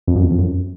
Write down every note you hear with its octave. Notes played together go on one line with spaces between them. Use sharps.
F2
F#2
E2
F2
F#2